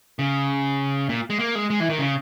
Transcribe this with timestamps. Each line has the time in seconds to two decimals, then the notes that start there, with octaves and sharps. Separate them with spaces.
0.19 C#3
1.09 A#2
1.30 G#3
1.39 A#3
1.55 G#3
1.70 G#3
1.80 E3
1.90 D#3
1.99 C#3